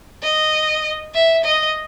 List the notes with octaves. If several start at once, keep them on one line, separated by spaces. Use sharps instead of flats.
D#5
E5
D#5